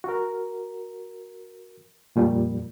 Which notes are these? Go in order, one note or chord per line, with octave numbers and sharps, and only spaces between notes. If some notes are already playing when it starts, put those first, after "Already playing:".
F#4 A#4
F2 A#2 G3